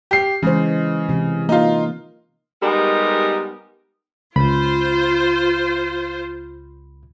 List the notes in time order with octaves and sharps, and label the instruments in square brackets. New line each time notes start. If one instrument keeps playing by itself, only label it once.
[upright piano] G4 C7
[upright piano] C#3 [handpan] E3 G#3 C5
[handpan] C3 E3
[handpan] A#3 [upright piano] D#4 F4
[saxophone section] G3 G#3 B3 D#4 G4 A#4
[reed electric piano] C#2 B5 [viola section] F4 C5